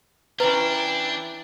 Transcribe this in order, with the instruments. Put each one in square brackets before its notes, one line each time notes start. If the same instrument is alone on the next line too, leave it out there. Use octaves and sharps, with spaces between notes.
[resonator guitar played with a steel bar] E3 C#4 A#5 [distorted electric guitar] D4 [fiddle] E4 G5 [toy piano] B4